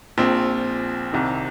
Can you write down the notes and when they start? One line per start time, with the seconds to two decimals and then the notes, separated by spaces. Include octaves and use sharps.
0.18 A#1 A#2 F3 C4
1.12 C2 C3 D#3